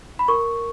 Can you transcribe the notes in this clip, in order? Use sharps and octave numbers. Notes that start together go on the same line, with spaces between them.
B5
A#4 C#6